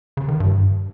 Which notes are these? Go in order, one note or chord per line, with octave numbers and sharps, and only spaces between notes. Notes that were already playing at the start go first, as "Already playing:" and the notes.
C#3
D#3
G2